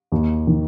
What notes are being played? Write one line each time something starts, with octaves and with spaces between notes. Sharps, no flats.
D#2
D#3